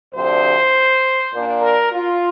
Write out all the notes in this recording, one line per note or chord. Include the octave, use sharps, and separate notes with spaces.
D2 C3 F3 D4 C5
A#2 A#3 D4
A#4
F4